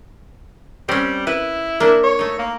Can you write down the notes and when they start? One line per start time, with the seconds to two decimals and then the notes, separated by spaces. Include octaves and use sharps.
0.89 G3 C4 C#4
1.27 E4 B4
1.80 A#3 D4
2.04 C#5
2.19 A3 D#4
2.39 A#3